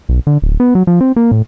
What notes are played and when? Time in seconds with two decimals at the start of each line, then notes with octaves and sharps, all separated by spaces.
0.09 B1
0.27 D3
0.42 D1
0.60 B3
0.75 F#3
0.87 F3
1.01 C4
1.16 A#3
1.31 A2